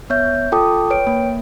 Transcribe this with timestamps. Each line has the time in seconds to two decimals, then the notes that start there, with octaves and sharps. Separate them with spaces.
0.10 B3 C#5 E5 G6
0.52 F4 A4 G5 A5 D6 D#6
0.90 B4 C#5 G5 D7
1.07 A#3